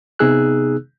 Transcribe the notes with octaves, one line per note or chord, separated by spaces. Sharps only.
C3 B3 D#4 G#4 E6 F#6